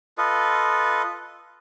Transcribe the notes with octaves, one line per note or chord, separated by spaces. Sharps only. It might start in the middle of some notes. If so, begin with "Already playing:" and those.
F4 A4 B4 D#5